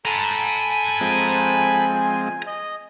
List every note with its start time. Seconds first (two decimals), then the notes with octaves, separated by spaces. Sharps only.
0.05 A4 G#5 A#5 B5
1.01 F3 G#3 C4
2.47 D#5